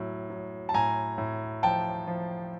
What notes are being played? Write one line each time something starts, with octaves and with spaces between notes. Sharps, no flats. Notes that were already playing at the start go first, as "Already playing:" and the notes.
Already playing: A2 F#3
F#3
A5
A2 G#5 A#5
A2
F3 G5 A5
F3